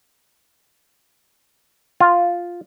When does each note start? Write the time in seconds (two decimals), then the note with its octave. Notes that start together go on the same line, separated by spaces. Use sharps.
2.00 F4